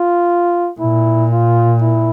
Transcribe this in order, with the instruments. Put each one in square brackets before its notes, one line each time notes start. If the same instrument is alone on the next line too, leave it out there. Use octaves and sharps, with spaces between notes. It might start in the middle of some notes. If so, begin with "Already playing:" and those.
Already playing: [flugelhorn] F4
[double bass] A#2 [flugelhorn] E4
[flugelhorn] F4
E4